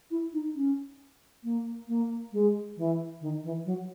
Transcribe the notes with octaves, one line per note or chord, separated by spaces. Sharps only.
E4
D#4
C#4
A#3
A#3
G#3
E3
D#3
E3
F#3